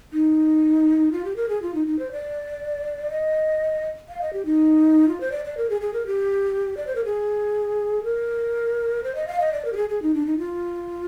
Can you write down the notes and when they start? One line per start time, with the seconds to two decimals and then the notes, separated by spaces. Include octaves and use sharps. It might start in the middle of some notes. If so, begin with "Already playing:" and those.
0.13 D#4
1.12 F4
1.25 G4
1.36 A#4
1.49 G#4
1.62 F4
1.74 D#4
1.87 D#4
1.99 C5
2.12 D5
3.11 D#5
4.09 F5
4.22 D#5
4.33 G4
4.46 D#4
5.08 F4
5.21 C5
5.32 D5
5.45 D5
5.57 A#4
5.70 G#4
5.81 G#4
5.94 A#4
6.07 G4
6.77 D5
6.87 C5
6.96 A#4
7.05 G#4
8.04 A#4
9.04 C5
9.15 D#5
9.28 F5
9.40 D#5
9.52 D5
9.65 A#4
9.73 G4
9.76 G#4
9.89 G#4
10.02 D#4
10.14 D4
10.27 D#4
10.38 F4